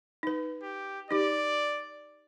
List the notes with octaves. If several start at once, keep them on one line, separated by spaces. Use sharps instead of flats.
D#4 B4
G4
D#4 G4 D5